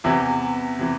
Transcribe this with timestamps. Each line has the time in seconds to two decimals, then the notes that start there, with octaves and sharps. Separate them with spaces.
0.04 E2 C3 E3 E4
0.79 C3 E3